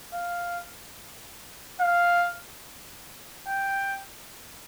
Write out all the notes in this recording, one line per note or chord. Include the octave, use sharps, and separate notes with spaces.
F5
F5
G5